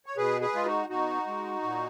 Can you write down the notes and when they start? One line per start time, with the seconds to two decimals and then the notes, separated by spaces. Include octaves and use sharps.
0.06 C#5
0.17 B2 G#4 B4
0.41 G#4 B4
0.54 G#3 F4
0.65 D#4 F#4
0.90 B2 D#4 F#4
1.27 G#3
1.62 A#2